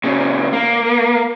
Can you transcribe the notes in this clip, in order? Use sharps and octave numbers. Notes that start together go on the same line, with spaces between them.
A#2 C#3
A#3